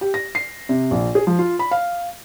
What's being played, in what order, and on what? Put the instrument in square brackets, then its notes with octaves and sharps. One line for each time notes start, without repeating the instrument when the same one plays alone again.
[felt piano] G4
A#6
C7
C3
A#1
G#4
F3
F4
B5
F5